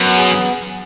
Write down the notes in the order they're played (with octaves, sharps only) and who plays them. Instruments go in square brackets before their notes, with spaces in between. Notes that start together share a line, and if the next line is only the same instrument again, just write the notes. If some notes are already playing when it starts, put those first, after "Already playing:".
Already playing: [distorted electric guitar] F#2 [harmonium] B3
[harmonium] G#4